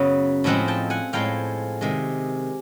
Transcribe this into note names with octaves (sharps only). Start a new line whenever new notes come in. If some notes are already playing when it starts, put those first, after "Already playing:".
Already playing: F#2 C#3 F#3 B3
A2 F3 G#3 C4 E5 F#5
G5 A5
F#5 G#5
A2 F3 G#3 C4 F5 G5
C3 D#3 G#3